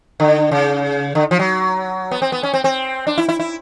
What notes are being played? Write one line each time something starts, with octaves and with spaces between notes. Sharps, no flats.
D3
C#3
D3
F3
F#3
B3
C4
B3
C#4
C4
C4
D4
E4
E4
E4